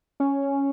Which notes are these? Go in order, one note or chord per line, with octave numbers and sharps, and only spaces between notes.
C#4